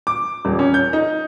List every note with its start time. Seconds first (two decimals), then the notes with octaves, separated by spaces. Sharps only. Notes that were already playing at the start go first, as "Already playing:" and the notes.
0.07 D6
0.45 D#1
0.59 C#4
0.74 G6
0.93 D#4